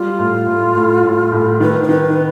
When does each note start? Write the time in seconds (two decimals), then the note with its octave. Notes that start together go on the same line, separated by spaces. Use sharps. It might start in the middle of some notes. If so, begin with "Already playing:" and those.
Already playing: G3 F4
0.19 A2
0.47 A2
0.75 A2
1.03 A2
1.32 A2
1.60 D#3 B4
1.83 C5
1.88 D#3 B4